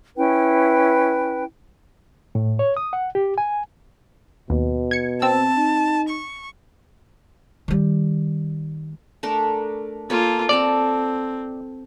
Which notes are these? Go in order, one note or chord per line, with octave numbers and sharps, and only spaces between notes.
C#4 E4 B4 G5
A2
C#5
D#6
F#5
G4
G#5
D#2 B2
G#6 C#7
C4 A5 E6
D#4
C#6
D#3 G3
A3 D4 A#4
A#3 F4 A4 C#5 G#5
C4 A4 D5 A5 A#5